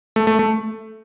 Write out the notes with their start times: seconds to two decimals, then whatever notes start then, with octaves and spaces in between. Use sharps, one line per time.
0.16 A3
0.27 A3
0.39 A3